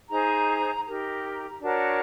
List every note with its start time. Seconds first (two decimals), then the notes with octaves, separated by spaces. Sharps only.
0.09 D#4 G#4 C5 A#5
0.85 D#4 G4 A#4 A#5
1.61 D4 F#4 A#4 C#5 A5